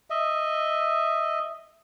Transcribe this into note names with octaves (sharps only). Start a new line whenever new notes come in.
D#5 E5